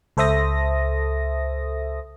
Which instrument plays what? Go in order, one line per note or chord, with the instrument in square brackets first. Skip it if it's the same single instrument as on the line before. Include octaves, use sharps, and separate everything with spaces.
[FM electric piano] C#2 A4 C5 E5 D#6 A#6